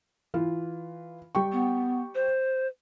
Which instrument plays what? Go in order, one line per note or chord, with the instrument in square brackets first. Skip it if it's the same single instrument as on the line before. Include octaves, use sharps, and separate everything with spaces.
[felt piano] E3 F4
G3 G5 C#6
[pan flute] B3
C5